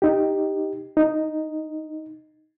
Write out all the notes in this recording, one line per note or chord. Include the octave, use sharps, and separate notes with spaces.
D#4 G4
D#4